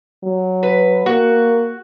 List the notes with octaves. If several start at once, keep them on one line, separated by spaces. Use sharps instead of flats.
F#3
B4
A#3 F#4